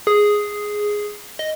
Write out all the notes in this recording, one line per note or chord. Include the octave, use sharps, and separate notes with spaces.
G#4
D#5